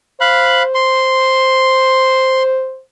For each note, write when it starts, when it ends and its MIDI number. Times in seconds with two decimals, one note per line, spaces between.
0.21 2.81 72
0.21 0.63 77
0.21 0.63 83
0.21 0.63 90
0.74 2.43 84